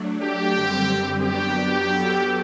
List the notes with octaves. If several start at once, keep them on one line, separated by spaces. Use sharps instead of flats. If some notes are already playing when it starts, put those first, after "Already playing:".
Already playing: F#3 A3 D4
G4
F#2 D3 G3 C4
F#2 F#3 B3 D4 F#4 G4
F#3 B3 F#4 A4